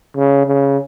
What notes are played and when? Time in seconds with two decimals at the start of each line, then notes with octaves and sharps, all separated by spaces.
0.16 C#3
0.46 C#3